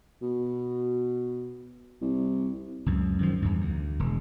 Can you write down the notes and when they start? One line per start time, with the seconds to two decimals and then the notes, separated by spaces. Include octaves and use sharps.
0.22 B2
2.01 C2
2.86 C#2 F#2
3.19 F#2 D#3 F3
3.42 E2 G2
3.60 D2
3.99 E1